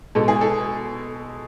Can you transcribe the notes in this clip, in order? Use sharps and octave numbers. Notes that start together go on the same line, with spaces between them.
B2 G#3 A4
G#4
A4